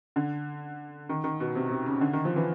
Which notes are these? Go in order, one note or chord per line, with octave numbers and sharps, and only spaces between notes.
D3
D#3
D#3
B2
C3
C3
C#3
D3
D#3
F3
E3